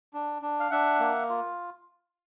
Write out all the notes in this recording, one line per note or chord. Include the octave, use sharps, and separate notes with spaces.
D4
D4
F5
D4 E5 F#5
A#3
F4